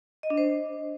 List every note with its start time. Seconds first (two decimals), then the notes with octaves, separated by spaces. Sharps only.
0.23 D#5
0.30 D4
0.37 C5